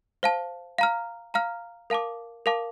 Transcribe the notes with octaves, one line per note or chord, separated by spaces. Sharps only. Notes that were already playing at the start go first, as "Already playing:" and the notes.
C5 F5 A5
F5 A#5 F6
F5 A#5 F6
A#4 F5 A5 D6
A#4 F5 A5 D6